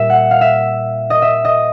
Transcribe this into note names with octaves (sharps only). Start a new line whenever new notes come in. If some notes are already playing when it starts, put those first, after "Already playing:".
Already playing: A#2 G3 E5
F#5
F5
E5
D#5
E5
D#5